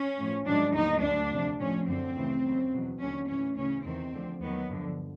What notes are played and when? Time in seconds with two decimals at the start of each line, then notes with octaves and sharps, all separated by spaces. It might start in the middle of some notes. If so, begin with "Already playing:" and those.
Already playing: C#4
0.18 A2 F3
0.46 G#2 D#3 F#3 D4
0.74 D#2 D3 F#3 D#4
1.03 D2 D3 F#3 D4
1.31 F2 C3 F3
1.59 A2 F3 C#4
1.87 F#2 D3 F3 C4
2.15 D2 C#3 E3
2.44 D#2 C#3 F#3
2.72 E2 B2 F#3
3.00 D#2 D3 F#3 C#4
3.28 A2 E3 C#4
3.56 D2 C#3 E3 C#4
3.85 E2 C3 D#3 C4
4.13 D2 D3 F3
4.41 D#2 D#3 F#3 B3
4.69 G2 D3 F3